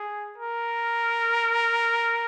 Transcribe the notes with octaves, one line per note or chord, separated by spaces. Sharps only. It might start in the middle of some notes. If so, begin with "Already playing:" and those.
Already playing: G#4
A#4